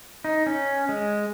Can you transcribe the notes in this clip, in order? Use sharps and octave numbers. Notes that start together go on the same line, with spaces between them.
D#4
C#4
G#3